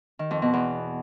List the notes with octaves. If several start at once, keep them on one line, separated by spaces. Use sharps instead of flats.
D#3
F2
B2
E2